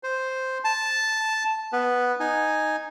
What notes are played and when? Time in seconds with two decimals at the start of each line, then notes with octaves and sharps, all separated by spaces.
0.03 C5
0.64 A5
1.73 B3 B4
2.20 D#4 G#5